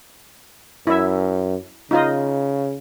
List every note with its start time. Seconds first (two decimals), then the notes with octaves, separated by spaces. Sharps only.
0.87 F#2 E4 E5
1.91 C#3 D#4 F4 D#5